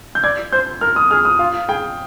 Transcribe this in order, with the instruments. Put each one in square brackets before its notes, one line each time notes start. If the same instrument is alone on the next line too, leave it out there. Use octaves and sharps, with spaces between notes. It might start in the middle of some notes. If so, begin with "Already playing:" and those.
[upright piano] G6
[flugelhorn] D5 [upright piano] G#6
[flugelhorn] C5 [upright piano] G6
[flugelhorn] A#4 [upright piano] F6
[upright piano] D#6
[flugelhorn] G#4 [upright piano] F6
[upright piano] D#6
[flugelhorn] F4 [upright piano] F5
[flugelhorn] G#4 [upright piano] G5